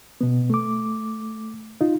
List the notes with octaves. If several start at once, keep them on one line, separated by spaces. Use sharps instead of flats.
B2 B3
A3 D6
D#4 F4